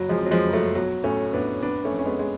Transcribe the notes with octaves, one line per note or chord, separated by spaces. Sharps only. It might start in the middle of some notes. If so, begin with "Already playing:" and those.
Already playing: F#1 F#3
F3 G#3
F2
F#3
F3 G#3
F#1
F#3 A3
B1 F#3
A2 A3 C#4
A2 B3 D4
F1 B3 D4
A3 C#4
F2
C#4
G#3 B3
G#3